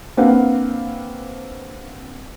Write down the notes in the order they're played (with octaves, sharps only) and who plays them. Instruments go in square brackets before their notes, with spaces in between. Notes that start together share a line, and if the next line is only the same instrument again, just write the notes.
[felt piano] A#3 C4 D4 B4 F5 F#5